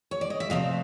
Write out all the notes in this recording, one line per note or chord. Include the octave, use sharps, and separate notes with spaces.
C#5
D5
D#5
E5
C3 F3 A3 C4 D#5 F5